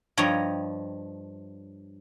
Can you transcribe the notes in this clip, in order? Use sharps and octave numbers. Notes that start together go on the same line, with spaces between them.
G2 F3 C#5 D#5 G5 A#5